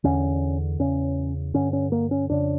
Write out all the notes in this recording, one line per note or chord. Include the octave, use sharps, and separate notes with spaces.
E2 D3 C#4
E2 C#3 C#4
G2 D3 C#4
C#4
A#3
C#4
F2 C#3 D4